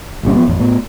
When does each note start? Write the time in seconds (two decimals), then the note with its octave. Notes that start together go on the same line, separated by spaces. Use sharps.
0.23 G1 A#2 G3 C#4
0.36 F3 B3
0.48 A1 F2
0.59 A2 B3